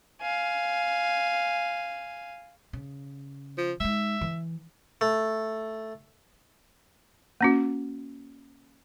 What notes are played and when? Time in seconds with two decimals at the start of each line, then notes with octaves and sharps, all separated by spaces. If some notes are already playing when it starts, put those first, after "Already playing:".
0.22 F5 G#5
2.73 C#3
3.58 F3
3.80 G#3 D#4 E5
4.21 E3
5.01 A3
7.41 A#3 C#4 F#4